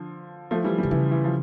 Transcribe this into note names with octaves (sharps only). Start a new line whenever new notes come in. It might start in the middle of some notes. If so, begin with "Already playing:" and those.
Already playing: D3 F3
F3 A3
E3 G3
D3 E3 G3
C#3 E3
E3
F3